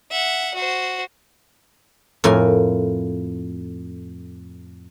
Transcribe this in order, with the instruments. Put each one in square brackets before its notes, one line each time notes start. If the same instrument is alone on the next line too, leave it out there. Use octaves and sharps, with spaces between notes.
[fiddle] E5 F#5
F#4 C5
[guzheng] F2 A2 A#4 G#5